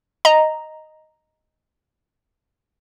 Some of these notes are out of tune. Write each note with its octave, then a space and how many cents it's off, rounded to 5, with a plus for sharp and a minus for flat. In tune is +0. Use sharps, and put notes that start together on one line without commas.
D#5 +0 A#5 +0